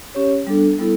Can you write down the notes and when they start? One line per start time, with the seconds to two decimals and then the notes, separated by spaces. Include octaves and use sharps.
0.15 C#4 G4 C#5
0.47 G3 B3 D4 A4
0.79 G3 B3 E4 A4